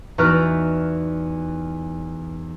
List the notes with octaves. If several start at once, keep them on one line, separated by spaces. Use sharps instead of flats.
E2 D#4 F#4 B4 D5 F6